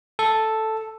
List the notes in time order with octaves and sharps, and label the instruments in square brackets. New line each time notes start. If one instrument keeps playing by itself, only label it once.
[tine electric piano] A4